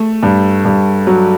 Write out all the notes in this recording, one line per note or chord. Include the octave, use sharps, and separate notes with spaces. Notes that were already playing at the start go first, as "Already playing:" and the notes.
Already playing: A3
G2
G2
F#3